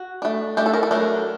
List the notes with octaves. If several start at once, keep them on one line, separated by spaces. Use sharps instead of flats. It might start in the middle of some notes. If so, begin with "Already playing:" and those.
Already playing: F#4
A3 D4
A3 D4 G4
A4
A#4
A4
F#3 A3 D4 A#4